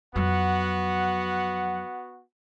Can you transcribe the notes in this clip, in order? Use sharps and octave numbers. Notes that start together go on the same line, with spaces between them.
F2 F#3 B3 F#4 F#5